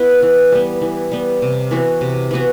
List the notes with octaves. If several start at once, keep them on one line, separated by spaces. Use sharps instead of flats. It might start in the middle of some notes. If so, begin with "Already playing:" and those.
Already playing: B3 E4 B4
E3
G3 B3
E3
G3 B3
C3
E3 B3 F#4
C3
E3 B3 F#4